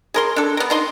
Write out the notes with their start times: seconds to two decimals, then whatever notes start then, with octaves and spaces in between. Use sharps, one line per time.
0.14 G#4 A#4 C6
0.36 D4 A4
0.57 B3 A#4
0.70 D4 D#4 C6